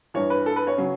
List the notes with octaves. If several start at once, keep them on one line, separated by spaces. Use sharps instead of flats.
G2 E3 C#5
B4
A4
B4
C#5
C#3 F#3